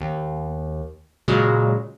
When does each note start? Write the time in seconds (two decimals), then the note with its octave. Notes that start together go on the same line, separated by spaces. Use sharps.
0.01 D#2
1.28 A#2 C#3 F#3 G#3